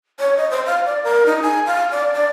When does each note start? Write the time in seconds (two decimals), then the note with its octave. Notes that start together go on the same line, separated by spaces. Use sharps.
0.20 C#5
0.37 D#5
0.51 C5
0.67 F5
0.86 D5
1.04 A#4
1.26 D#4
1.42 G#5
1.67 F5
1.92 D5
2.13 D5